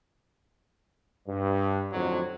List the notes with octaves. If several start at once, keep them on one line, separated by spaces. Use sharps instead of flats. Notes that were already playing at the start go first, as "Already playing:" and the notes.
G2
F2 A2 D3 F#3 D#4